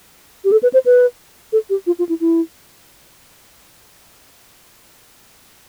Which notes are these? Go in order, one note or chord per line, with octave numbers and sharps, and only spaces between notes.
G4
A4
B4
C5
B4
A4
G4
F4
F4
E4
E4